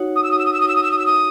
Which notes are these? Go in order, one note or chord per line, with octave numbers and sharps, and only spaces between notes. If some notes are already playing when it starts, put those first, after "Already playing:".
Already playing: D#4 F#4 C#5 F#5
D#6
E6
D#6
E6
D#6
E6
D#6
E6
D#6
E6
D#6
E6
D#6